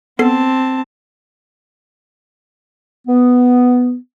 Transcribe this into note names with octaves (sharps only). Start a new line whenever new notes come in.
B3 C4 A4 A5 C7
B3